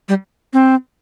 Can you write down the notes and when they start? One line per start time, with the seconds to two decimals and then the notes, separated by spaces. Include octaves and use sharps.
0.09 G3
0.53 C4